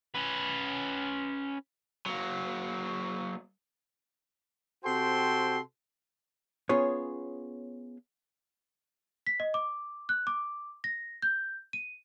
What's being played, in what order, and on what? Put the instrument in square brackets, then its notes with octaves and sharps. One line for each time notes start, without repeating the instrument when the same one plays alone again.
[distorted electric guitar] C#4 B4
[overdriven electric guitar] F#3 A#3
[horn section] C3 F#4 A4 C5 G5 C6
[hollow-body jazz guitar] B3 C#4 F4 G#4 C#5
[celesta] B6
D#5
D6
F#6
D6
A#6
G6
D#7